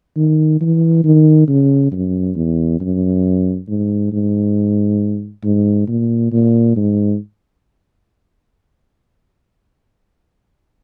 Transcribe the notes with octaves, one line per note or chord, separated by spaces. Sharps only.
D#3
E3
D#3
C#3
F#2
E2
F#2
G#2
G#2
G#2
A#2
A#2
G#2